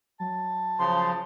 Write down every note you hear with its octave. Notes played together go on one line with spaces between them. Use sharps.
F#3 A5
C#3 F3 C6